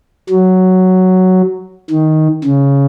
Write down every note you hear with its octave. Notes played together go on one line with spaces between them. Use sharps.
F#3
D#3
C#3